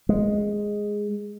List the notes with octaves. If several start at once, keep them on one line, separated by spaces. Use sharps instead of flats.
G#3